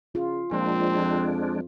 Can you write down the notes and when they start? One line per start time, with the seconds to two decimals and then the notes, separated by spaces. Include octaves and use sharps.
0.15 C#3 F4
0.51 A#2 F3 G#3 C4 D4
0.98 F2